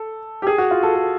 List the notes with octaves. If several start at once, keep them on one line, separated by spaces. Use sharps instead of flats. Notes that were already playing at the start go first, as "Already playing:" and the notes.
Already playing: A4
G4
G#4
F#4
F4
A4
A4